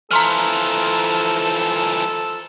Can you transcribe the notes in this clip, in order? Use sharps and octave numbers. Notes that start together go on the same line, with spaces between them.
E3 F3 A4 A#5 C6 F6